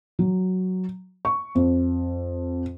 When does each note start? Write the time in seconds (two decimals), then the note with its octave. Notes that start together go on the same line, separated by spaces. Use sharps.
0.19 F#3
1.25 C#6
1.55 F2